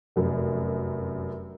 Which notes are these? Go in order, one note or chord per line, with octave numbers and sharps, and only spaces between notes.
F1 F#2